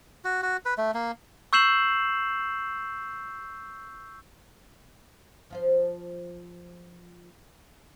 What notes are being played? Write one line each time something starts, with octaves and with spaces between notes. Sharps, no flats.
F#4
F#4
B4
A3
A#3
C#6 E6 G6 C7 E7 F#7
F3 F4 C5